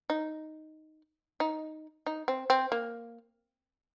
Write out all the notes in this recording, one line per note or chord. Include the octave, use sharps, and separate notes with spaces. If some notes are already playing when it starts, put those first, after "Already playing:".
D#4
D#4
D#4
C4
C4
A#3